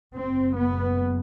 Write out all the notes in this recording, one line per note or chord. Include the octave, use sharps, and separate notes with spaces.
F#1 F#2 C4
B3